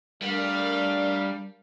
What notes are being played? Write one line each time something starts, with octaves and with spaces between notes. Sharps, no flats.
G3 A3 D4 A#4 F5